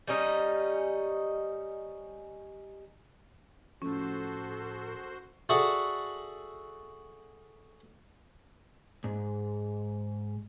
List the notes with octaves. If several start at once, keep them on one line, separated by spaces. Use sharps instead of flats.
G3 C#4 D#4
A2 F3 C#4 F#4 A4 C5
F#4 G#4 A4 D5 E5 F#5
G#2